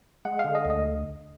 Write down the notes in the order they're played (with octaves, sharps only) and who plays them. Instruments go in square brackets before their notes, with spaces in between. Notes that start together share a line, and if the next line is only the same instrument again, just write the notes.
[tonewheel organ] G#3 [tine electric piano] F#5
[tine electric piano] F5
[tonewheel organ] D3
[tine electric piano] D#5
[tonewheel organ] D2 [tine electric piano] D#5